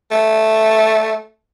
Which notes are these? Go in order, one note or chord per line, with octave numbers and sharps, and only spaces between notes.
A3